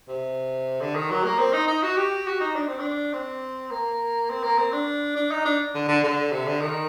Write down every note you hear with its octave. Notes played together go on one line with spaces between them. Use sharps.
C3
D3
D#3
F#3
A#3
C4
D#4
D#4
F#4
G4
F#4
D#4
D4
C4
D4
C4
A#3
C4
A#3
C4
D4
D4
D#4
D4
D3
D3
D3
C3
D3
D#3